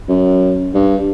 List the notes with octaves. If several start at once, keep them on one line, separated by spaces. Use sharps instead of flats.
F#2
G2